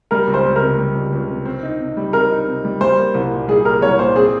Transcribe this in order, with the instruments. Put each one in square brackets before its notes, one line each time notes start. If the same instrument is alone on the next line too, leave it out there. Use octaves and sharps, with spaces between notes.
[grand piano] G3 [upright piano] A#4
[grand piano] C#2
[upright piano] C5
[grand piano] C#2
[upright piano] A#4
[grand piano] C3
G3
C#2
C#2
C3
C4
D#4
C3
G3
[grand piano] C4 [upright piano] A#4
[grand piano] D#4
C3
G3
[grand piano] G3 [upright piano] C5
[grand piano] A#3
C2
A#2
[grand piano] G3 [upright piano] G#4
[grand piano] A#3 [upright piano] A#4
[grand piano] C2 [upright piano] C#5
[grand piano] A#2 [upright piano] C5
[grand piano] C4 [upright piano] G#4